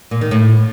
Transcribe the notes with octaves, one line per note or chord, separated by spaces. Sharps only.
A#2
D#3
A2